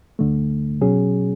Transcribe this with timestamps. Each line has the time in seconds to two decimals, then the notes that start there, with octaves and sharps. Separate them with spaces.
0.19 D2 D3 A3
0.81 B2 F#3 C#4 G#4